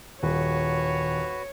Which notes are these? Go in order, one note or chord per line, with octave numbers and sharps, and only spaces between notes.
D#1 F#4 B4 C#5